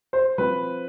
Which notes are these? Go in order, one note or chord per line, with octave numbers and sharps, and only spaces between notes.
C5
F3 C4 B4